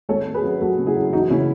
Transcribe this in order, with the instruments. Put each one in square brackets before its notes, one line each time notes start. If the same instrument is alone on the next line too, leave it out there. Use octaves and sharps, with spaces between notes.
[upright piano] G#1 A4 C#5
G#1
G#4 B4
F#2
F#2 F#4 A4
C#3
E4 G#4
F#2
E3 D#4 F#4
C#3 C#4 E4